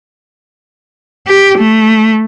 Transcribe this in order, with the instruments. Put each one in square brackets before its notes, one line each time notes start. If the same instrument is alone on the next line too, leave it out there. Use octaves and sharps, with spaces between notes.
[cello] G4
A3